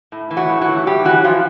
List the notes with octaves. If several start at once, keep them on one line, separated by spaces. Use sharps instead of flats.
A2
E3
F#3 F#4
A2
F#3 F#4
E3
A2 G3 G4
E3 F#3 F#4
E3 F3 F4